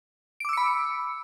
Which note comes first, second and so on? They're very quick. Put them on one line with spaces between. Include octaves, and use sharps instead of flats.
D7 D6 E6 C#7 B5